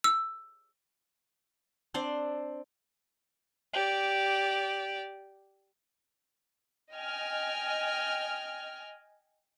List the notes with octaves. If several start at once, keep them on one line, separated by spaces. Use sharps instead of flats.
E6
C4 D4 C5 D5
G4 D5
D#5 G5 G#5 F6